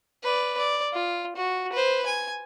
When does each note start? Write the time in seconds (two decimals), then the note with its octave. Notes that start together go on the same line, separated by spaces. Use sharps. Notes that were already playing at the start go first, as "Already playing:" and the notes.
0.23 B4 D5
0.58 D5
0.93 F4
1.36 F#4
1.72 B4 C5
2.06 G#5